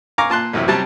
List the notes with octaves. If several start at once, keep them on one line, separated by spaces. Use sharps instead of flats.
F5 G#5 A#5 C#6 D6
A#2 A5 C6 F#6
A1 F#2 C3 E4
C3 F#3 G3 A5